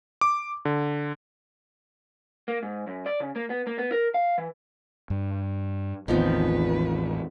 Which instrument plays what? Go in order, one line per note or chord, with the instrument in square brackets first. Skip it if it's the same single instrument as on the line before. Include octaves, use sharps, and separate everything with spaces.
[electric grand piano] D6
D3
[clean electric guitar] A#3
G#2
F#2
D5
C#3
A#3
B3
A#3
B3
A#4
F5
E3
[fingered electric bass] G2
[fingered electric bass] A1 C4 [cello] E2 B4 [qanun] D#3 F3 B3